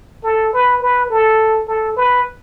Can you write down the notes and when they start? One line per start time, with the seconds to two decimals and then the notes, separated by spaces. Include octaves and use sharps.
0.23 A4
0.53 B4
0.82 B4
1.10 A4
1.68 A4
1.96 B4